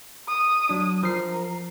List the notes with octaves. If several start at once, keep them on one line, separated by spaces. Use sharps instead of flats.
D#6
F#3 D4
F3 A#4 C7